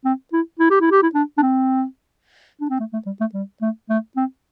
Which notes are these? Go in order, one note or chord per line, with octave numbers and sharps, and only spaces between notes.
C4
E4
E4
G4
E4
G4
E4
D4
D4
C4
D4
C4
A3
A3
G3
A3
G3
A3
A3
C4